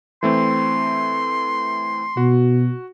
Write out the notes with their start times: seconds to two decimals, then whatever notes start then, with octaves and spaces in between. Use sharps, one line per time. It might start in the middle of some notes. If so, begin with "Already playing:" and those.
0.23 E3 A3 C4 C6
2.17 B2 F#4